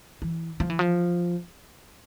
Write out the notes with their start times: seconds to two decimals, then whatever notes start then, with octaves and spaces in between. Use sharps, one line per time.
0.22 E3
0.60 F3
0.70 E3
0.79 F3